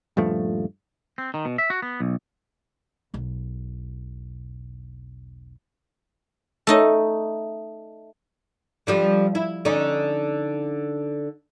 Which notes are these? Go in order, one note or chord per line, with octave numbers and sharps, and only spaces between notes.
D#1 G2 F3 A3
C4
D#3
B2
E5
F#4
B3
B1
E1 B1
A3 D#4 D#5
D3 F3 G3
E4
D3 C#4 D#4